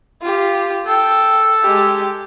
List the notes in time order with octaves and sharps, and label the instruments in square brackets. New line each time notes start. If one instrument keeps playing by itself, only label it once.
[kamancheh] F4 G4
[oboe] A4 [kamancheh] G5
[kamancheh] G#3 G4